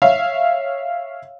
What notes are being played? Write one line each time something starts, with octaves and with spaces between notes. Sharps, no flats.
C#5 E5 F5